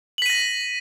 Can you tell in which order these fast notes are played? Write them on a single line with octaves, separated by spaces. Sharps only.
F#7 B6 D#7 A#6